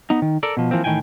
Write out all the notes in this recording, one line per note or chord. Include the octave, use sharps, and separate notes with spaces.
B3 D#4
D#3
A4 A#4 D5
B2 F3
E3 F3 A#3 C4
A2 D#3 E3 G5 G#5